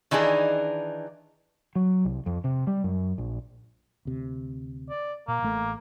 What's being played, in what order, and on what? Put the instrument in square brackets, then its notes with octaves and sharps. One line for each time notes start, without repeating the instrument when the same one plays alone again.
[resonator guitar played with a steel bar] D#3 E3 D4 D#4 G#4
[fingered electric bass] F#3
C2
F2
C3
G3
F#2
A#1
[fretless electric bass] D2 C3
[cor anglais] D5
[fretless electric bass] A#2 [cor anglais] A#3
[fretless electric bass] A1 A3